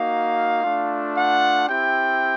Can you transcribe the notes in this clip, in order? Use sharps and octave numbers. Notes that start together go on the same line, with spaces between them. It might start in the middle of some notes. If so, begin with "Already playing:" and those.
Already playing: A#3 D#4 F#4 F5
A3 D4 F4
F#5
C4 E4 G4 G5